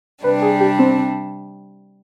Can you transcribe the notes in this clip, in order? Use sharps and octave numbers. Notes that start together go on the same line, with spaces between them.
C3 G3 D4 B4
G#4
G4
C4